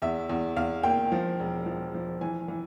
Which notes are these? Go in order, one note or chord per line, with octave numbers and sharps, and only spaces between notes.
E2 E5
E2
E2 F5
A#3 G5
F3
E1
F3
F3
E3 G#5
E3